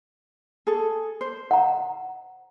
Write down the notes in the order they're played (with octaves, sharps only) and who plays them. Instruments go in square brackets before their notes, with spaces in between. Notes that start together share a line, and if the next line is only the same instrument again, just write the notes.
[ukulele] G#4 A4
C5
[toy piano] F#5 A#5